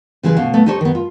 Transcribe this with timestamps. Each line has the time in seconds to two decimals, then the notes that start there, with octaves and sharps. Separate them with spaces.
0.23 C#3 E3 G#3 G#4 B4
0.36 D2 B2 F5
0.54 A3 B3
0.66 D#4 G4 A4 C5 C#5
0.81 D#3 B3
0.95 F4